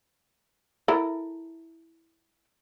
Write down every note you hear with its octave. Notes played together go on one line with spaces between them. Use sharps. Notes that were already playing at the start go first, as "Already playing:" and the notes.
E4 A4 A#4